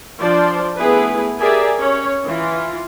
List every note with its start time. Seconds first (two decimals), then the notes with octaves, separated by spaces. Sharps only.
0.20 F3 D4 C5 D5
0.78 A3 B3 E4 G#4 B4
1.39 G4 G#4 A#4 D5 E5 G#5
1.79 C#4 C#5
2.26 E3 F4